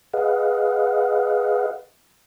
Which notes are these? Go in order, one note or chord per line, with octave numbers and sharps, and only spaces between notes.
G#4 B4 D#5 F5 F#5